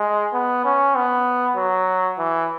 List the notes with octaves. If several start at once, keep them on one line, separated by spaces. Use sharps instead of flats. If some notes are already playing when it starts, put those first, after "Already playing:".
Already playing: G#3
B3
C#4
B3
F#3
E3